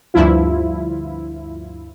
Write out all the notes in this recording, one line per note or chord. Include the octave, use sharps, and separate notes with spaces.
D2 G2 F3 E4 F4